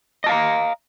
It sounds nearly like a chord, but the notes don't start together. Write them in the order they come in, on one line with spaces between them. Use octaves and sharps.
D#5 A5 F5 A#5